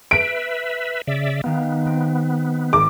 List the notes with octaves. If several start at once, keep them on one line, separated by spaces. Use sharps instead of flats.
B4 E5 D7
C#3 D5 E5
D#3 B3 G4 F5
C4
G#1 D6